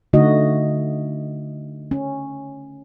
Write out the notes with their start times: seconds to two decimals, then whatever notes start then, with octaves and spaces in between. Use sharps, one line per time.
0.13 D3 A3 D#4 F#4 D#5
1.91 C#4